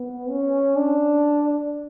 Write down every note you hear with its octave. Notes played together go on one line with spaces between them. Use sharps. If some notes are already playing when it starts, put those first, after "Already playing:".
Already playing: B3
C#4
D4